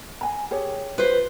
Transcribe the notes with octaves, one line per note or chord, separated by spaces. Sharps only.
G#5 A#5
G4 G#4 C#5
F4 B4 C5